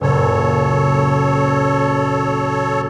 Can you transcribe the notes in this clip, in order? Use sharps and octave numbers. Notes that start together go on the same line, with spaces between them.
F#1 C#2 A#2 A4 C#5